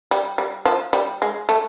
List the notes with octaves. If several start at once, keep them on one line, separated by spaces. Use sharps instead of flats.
G3
G3
F3
G3
G#3
A3